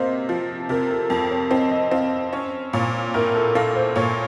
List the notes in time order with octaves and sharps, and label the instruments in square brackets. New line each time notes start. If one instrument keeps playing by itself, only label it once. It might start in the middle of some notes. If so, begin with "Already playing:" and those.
Already playing: [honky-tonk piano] C3 A#3 [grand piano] C5 D#5
[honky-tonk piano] F3
[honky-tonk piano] C3 [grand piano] A#4
[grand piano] A4
[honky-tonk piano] F2 [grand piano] A#4
[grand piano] C#5
[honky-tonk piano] C4 [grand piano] D#5
[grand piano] D#5
[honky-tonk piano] C4 [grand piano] F5
[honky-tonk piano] C#4 [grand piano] C#5
[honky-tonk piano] A#2 [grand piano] C#5
[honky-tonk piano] A2 [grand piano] A#4
[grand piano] A4
[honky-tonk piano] A#3 [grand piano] A4
[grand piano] C5
[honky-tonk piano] A#2 [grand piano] C#5